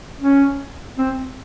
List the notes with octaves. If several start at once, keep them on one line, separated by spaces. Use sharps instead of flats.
C#4
C4